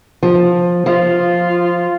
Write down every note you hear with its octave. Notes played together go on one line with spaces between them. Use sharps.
F3
F3 F4